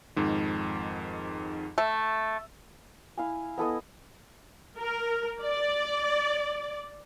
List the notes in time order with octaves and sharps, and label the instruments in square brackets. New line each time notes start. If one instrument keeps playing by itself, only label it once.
[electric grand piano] F2 G#2 D#3
[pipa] A3 [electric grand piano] E6
[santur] E4 F5 G#5
B3 E4 A4 D#5
[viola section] A#4
D5